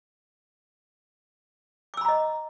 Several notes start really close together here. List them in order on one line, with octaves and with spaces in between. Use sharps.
D6 E6 B5 A#5 D#5